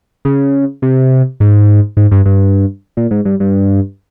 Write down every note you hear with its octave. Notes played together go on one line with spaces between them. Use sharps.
C#3
C3
G#2
G#2
G2
G2
A#2
G#2
G2
G2